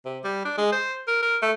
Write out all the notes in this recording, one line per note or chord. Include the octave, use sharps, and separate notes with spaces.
C3
G3
D4
G#3
C5
A#4
A#4
A3